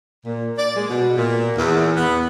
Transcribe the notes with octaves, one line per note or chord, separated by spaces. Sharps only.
A#2
D5
G#3
B2
A#2
E2
B3